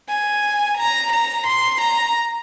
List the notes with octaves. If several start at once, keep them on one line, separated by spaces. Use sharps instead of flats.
G#5
A#5
A#5
C6
A#5